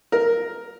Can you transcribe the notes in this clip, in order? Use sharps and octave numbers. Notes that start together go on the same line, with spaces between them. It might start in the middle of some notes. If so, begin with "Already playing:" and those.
A#4